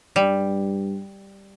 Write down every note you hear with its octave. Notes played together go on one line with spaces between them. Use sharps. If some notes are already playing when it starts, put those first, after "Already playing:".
G2 G3